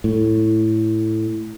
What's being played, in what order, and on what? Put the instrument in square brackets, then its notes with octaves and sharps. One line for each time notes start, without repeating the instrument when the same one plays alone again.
[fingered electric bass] A2